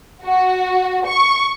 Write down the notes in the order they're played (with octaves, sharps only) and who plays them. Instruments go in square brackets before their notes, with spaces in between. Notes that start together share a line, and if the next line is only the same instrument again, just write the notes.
[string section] F#4
C#6